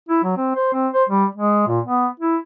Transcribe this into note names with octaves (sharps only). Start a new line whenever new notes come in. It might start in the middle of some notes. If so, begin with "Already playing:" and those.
E4
F#3
C4
C5
C4
C5
G3
G#3
A#2
B3
E4